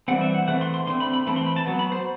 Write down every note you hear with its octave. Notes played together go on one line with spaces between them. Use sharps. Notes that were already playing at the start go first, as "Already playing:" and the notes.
E3 G3 C4 F#5
E5
F#5
E3 A3 C4 F#5
C6
C6
D3 A3 C4 C6
B5
B5
E3 A3 C4 B5
C6
B5
A5
F#3 B3
B5
C5